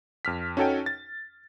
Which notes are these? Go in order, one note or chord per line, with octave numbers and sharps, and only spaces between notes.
F2 F6 B6
C#4 D#4 F#4 A4 C#5 G5
A6